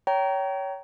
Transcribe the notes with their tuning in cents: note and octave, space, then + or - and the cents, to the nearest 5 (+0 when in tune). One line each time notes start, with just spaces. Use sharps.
C#5 +20 G5 -25 A#5 +0